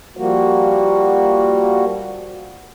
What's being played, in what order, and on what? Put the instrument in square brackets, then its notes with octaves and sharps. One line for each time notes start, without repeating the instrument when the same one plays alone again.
[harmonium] F3 G3 A#3 F#4